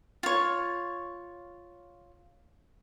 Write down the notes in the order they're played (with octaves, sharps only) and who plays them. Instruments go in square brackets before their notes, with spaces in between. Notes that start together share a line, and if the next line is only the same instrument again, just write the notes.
[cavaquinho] F4 C#5